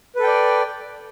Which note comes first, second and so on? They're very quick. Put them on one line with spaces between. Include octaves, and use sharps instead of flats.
B4 A4 G5 D5